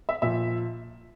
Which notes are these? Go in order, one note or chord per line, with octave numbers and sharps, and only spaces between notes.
E5
A#2 F3 E5